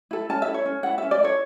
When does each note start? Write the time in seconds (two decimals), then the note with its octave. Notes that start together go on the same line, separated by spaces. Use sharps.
0.11 E4 A4
0.29 C#4 A5
0.42 E5
0.47 E4 A4
0.54 C#5
0.66 C#4
0.83 E4 A4 F#5
0.98 C#4 E5
1.11 D5
1.21 E4 A4 C#5